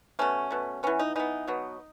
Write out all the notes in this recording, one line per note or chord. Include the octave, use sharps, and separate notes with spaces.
B2 A3 C#4
B2 A3
E3 B3 C#4
D#4
E3 B3 D#4
B2 F#3 B3